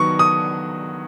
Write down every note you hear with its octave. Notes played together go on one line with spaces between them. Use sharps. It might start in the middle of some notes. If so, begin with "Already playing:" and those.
Already playing: D#3 F#3 B3 C#6
D#6